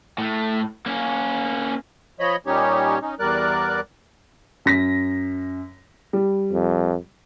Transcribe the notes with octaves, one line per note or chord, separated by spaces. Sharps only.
A2 A3
A#3 C#4
F3 C#5 D#5 B5
A#2 G3 C#4 D#4 G4 C#5
C#4 D#4
E2 G3 A#4 D5 F#6
F#2 A#6 B6
G3
F2